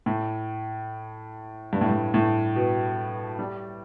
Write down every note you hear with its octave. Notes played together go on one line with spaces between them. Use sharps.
A2
G2
A2
G2
A2
B2
G3